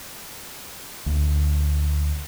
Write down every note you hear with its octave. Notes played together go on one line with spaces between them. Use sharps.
D2